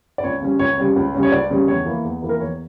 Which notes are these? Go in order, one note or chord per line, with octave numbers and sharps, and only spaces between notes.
D5
C#2 C#5
C#3 G3 C#4
C#2 C#5
C#3 G3 C#4
C#2
C#3 G3 C#4
C#5
C#2 D5
C#3 G3 C#4
E2 C#5
E3 A#3
E2
E3 A#3
A#4
E2 C#5